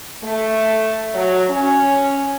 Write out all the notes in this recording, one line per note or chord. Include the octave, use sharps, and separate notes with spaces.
A3
F#3
C#4